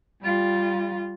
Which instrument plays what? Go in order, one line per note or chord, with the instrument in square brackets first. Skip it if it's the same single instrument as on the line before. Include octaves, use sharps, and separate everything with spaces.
[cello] G3 F4